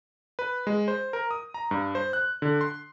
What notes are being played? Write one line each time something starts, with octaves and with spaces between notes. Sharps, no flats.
B4
G#3
C5
A#4
D#6
A#5
G2
C5
F#6
D3
C6